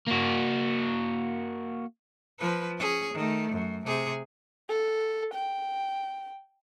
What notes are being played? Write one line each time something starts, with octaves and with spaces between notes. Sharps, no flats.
A#3 F#4
F3 B4
C#4 G#4
D#3 A3
F#2
C3 G#4
A4
G5